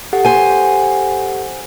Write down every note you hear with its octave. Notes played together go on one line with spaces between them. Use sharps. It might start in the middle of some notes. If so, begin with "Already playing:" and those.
G4 A4 F#5
C5 G#5